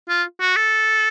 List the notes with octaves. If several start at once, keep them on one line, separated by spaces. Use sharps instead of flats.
F4
F#4
A4